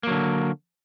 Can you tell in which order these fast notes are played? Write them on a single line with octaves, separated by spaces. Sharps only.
A#3 F#3 D3